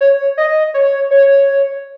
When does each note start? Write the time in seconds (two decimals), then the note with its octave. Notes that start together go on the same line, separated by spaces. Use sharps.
0.01 C#5
0.38 D#5
0.74 C#5
1.11 C#5